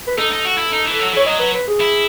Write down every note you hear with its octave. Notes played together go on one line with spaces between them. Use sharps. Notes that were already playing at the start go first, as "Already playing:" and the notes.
B4
D#4 A4
D#4
F#4
E4
D#4
E3
F#3
E3 C#5
F#3 D#5
B4
B4
G#4
E4